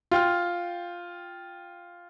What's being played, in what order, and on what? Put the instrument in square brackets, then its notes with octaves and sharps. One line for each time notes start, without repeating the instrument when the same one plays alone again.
[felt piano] F4 G5 F6